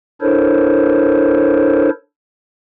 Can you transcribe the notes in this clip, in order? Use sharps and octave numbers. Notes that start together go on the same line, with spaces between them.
D4 E4 A4 A#4 C5 C#5